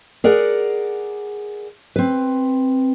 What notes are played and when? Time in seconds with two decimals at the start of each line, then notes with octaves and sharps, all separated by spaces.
0.24 G#4 A#4 D5 F#5
1.96 C4 B4